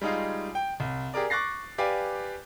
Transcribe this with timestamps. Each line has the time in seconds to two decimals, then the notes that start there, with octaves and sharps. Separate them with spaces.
0.01 G3 G#3 D#4 F4 G#4
0.55 G5
0.80 C2
1.14 G4 G#4 A#4 D5
1.30 C#6 D6 F#6 A6 A#6 C7
1.78 G4 B4 D5 F5 G#5